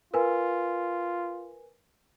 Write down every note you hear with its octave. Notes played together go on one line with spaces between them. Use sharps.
F4 A#4 B4 G#5